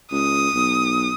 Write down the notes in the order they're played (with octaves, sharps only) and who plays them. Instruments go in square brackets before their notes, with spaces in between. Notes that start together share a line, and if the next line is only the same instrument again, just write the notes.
[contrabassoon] C#2 [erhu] D#6
[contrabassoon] B1